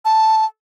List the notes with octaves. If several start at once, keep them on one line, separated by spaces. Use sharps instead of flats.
A5